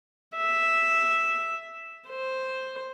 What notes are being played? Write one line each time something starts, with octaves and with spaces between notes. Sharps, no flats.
E5
C5